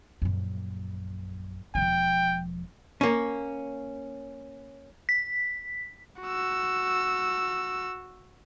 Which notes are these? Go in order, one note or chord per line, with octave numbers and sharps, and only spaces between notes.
A#1 F#2
E1 F3 G5
A#3 C#4
B6
F#4 E6